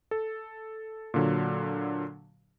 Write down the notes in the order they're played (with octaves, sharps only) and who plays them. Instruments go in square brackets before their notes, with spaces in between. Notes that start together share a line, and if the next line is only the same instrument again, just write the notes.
[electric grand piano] A4
A#2 D3 F#3